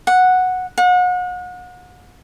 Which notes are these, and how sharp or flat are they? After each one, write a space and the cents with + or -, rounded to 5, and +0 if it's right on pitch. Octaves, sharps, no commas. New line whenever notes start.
F#5 -5
F#5 -40